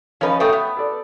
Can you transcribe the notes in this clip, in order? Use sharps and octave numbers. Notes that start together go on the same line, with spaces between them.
F3 C#4 D#4 A#4 B4
A3 G5 C#6 D#6
B3
A4 D5